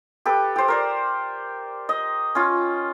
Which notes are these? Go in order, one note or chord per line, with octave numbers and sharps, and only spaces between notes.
G4 A4 B4
G4 C5
A#4 C5 D5
D#5
C#4 F4